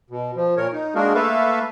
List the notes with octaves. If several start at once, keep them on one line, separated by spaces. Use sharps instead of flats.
B2
F3
A#2 A#4 C#5
D#4
G#3 A#3 D4 F#4 G#4 A#4
A3 A#3 A4 B4 E5 F5